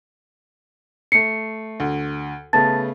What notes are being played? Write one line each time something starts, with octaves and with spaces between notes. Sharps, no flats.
A3 C7 C#7
D2
C#3 A3 B3 A5 A6